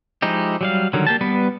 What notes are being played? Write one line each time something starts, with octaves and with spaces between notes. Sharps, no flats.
F3 G#3 D#4 E4 G4
F#3 G3 F5
D3 D#3 F#3 G3
A#3 G4 A5
G3 B3 B4